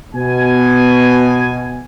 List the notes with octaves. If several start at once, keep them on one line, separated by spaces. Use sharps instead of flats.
B2 B3 G#5